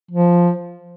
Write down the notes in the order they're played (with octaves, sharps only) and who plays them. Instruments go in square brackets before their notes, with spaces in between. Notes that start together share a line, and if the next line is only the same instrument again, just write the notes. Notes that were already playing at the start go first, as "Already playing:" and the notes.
[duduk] F3